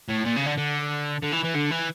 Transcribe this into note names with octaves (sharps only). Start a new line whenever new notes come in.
A2
A#2
C#3
D3
D3
D3
E3
E3
D3
E3